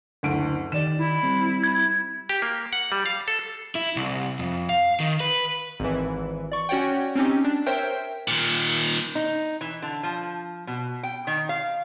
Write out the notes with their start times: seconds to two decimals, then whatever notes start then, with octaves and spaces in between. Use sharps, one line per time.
0.23 F#1 D2 D7
0.72 D#3 D#4 G4 D5 E7
0.98 E4
1.23 G3 C4
1.64 G#6
2.29 G4
2.42 A#3
2.73 F#5
2.92 G3
3.06 F5
3.28 A4
3.75 E4
3.96 C2
4.39 F2
4.69 F5
5.00 D#3
5.20 B4
5.80 G#1 E3
6.52 D5 C#6
6.69 C#4 F#4 C#5 D5 F#5 G5
7.15 C4 C#4 D#4 G4
7.44 D4
7.66 A#4 C5 C#5 E5 G5
8.28 A#2 D#3
9.15 D#4
9.61 E3
9.82 D3
10.03 F3
10.67 B2
11.03 G5
11.27 D#3
11.49 F5